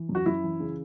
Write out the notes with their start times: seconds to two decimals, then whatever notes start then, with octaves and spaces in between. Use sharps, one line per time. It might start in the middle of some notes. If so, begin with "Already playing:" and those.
Already playing: E3
0.09 F#2
0.15 F#4
0.26 F#2 E4
0.44 E3
0.60 C#3